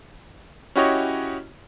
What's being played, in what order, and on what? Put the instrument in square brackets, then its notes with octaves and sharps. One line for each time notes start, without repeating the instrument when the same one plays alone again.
[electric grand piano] C#4 E4 F#4 G4 C#5 D#5